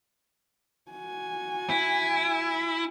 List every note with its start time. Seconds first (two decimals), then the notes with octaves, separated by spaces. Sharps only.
0.91 F#4 G#5
1.70 E4